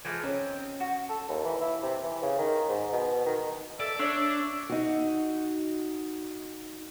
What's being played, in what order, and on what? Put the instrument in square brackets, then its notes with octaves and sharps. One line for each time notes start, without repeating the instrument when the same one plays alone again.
[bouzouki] E3 F3 G#3
[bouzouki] C4 D#4 [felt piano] C#4 C#5
[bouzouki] F#4
[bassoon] A4
D#2
E3
E4
C3
E3
C#3
D#3
G#2
B2
D#3
[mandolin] A4 [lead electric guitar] D5 [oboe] E5
[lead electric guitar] D4 [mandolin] C#5 D5 [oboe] E5
[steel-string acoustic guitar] D#4 F#4